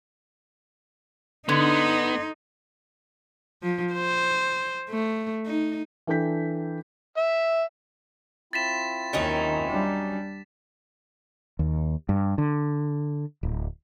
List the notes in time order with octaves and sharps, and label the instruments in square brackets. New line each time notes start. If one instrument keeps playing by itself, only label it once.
[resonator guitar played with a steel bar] D3 [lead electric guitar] B3 [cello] D#4 [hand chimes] C6 G#6
[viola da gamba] F3
C5
A3
D#4
[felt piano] E3 D4 A4 G5 G6 B6
[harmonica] E5
[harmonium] C4 E4 F4 [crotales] A6 B6 E7
[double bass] D#2 D#3 [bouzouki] F#3 C#4 D#4
[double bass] G3 D4
[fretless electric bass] D#2
G2
D3
D1